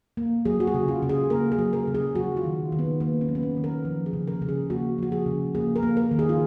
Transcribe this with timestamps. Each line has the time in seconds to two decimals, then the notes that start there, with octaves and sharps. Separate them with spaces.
0.17 A#3
0.45 F#3 G#4
0.60 F#4
0.67 G#4
0.74 C#3
0.88 F4
1.03 C#3
1.09 G#4
1.30 A#3 A#4
1.52 G#4
1.59 F#3
1.73 A#4
1.87 C#3
1.95 G#4
2.15 F#3 F#4
2.37 F4
2.44 D#3
2.72 D#3
2.79 B3
3.00 A#3 B3
3.21 C#4
3.29 F#3
3.35 B3
3.43 C#4
3.57 D#3
3.64 A#4
3.85 F3
4.06 G#4
4.13 C#3
4.27 A#4
4.42 C#3
4.49 G#4
4.70 A#3 F#4
4.98 F3 F#4
5.12 G#4
5.26 C#3
5.55 A#3 G#4
5.76 A#4
5.83 A#3
5.97 A#4
6.11 D#3
6.19 G#4
6.29 F4